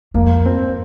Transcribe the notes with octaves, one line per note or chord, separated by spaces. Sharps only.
F2 A#3
C4